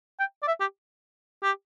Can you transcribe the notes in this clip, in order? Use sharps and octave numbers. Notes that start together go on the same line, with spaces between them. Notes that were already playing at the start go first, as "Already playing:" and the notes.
G5
D5
E5
G4
G4